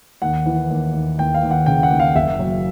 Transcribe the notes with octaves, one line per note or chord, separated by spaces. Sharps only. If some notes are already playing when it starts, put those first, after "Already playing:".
D#2 F#5
E3
D#2
D#2
D#2 G5
F5
D#2
F#5
C#3 G5
F#5
D#2
F5
F#1 E5
F#3